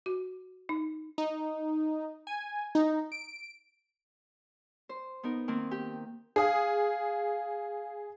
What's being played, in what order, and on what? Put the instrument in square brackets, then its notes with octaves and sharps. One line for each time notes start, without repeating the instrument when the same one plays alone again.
[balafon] F#4
D#4
[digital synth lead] D#4
G#5
D#4
D7
[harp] C5
B3 D#4 A#4
D#3 A#3 C4
G4
[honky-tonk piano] G#4 D#6 [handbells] F5 C7